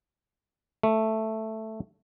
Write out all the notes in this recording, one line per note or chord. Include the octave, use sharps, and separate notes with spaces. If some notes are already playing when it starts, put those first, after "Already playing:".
A3